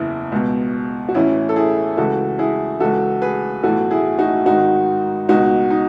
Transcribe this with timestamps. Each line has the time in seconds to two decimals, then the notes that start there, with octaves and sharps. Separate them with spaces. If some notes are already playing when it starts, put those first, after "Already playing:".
Already playing: F#1 E2 C#3 E3 E4
0.32 C#2 B2
1.09 F#4
1.14 A1 A2 E3 C#4 E4
1.49 A4
1.56 E4 G#4
1.97 C#2 C#3 E3 F#4 A4
2.39 E4 G#4
2.80 C#2 C#3 E3 F#4 A4
3.22 G#4 B4
3.63 B1 A2 E3 F#4 A4
3.91 E4 G#4
4.19 D#4 F#4
4.46 G#1 G#2 D#3 D#4 F#4
5.29 C#2 B2 D#4 F#4
5.70 D#4